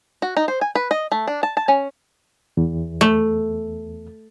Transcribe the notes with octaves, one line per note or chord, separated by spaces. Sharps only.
F#4
D#4
C5
G#5
B4
D#5
A3
D4
A5
A5
C#4
E2
A3